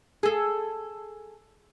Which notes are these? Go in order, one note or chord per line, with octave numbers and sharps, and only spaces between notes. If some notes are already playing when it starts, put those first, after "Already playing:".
G#4 A4